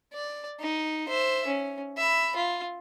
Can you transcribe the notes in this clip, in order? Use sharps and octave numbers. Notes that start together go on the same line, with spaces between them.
D5
D#4
C5 E5
C#4
E5 B5
F4